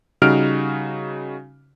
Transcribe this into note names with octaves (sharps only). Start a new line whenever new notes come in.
C#3 G3 D#4 F#4 F6 D7